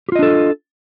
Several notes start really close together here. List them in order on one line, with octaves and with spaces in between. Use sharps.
G4 F4 D#5 D4 A4